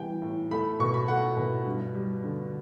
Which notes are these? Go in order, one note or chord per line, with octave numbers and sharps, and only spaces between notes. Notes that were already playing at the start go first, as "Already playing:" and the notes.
Already playing: E3 G3 G5
A2
A3 B5
B2 C#6
B5
A3 F#5
B2
G2
G3
D3